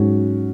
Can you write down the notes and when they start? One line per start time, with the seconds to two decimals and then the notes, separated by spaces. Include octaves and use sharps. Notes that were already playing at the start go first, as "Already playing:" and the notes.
Already playing: G#2 F#3 C#4 F#4